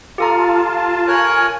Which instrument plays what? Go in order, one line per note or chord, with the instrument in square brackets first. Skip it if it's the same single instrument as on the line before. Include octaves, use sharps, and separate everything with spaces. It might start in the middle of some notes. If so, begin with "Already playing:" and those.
[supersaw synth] F4 A5 [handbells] G4 A4 A#5
[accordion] A#4 C#5 F#6 [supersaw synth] G#5